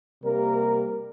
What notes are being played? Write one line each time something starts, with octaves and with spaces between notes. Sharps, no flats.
C3 G3 A#3 A#4